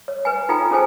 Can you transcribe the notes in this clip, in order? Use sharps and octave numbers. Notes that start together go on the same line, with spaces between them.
C#5
B4 G#5
D#4 F4 A4 G5 G#5 A#5
C#4 G#4 A4 C5 G#5 A5